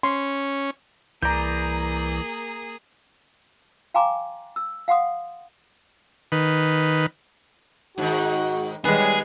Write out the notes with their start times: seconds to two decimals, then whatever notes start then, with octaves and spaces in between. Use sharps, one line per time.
0.03 C#4 C6
1.22 C2 E3 A#3 G#4 D5 A#5 G6
3.94 F5 G5 G#5 A#5 C6 D6
4.56 E6
4.88 F5 F#5 C6 D#6
6.32 D#3 B4
7.98 G#2 D#3 F#4
8.85 D#2 G3 G#3 B3 G#4